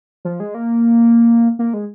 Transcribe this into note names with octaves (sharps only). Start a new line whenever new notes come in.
F3
G#3
A#3
A#3
G#3